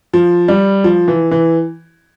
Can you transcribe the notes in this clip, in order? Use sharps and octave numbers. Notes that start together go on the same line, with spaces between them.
F3
G3
F3
E3
E3